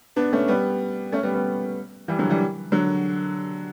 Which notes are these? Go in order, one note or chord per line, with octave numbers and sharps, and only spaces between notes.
B3 D4
A3 C#4
G3 B3
A3 C#4
G3 B3
G3 B3
E3 G3
D3 F#3
E3 G3
D3 F#3